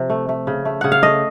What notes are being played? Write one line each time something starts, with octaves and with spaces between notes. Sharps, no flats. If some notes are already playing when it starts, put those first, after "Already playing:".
Already playing: C3 F3
A3
A3
C#3
A3
C#3 F#5
F5
A3 D#5